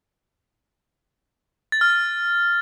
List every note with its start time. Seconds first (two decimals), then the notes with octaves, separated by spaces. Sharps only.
1.72 A6
1.81 F6
1.90 A6